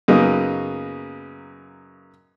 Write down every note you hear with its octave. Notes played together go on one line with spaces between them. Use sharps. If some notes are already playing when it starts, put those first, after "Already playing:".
F#2 C#3 A#3 B3 D#4